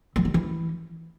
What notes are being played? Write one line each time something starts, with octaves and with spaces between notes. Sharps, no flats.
F#3
G3
E3